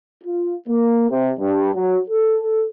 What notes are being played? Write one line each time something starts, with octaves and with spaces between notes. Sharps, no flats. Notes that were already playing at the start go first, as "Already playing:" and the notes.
F4
A#3
C3
G2
F#3
A4